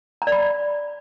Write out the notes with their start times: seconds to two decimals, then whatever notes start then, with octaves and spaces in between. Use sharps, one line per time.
0.22 A#5
0.27 D5
0.32 B5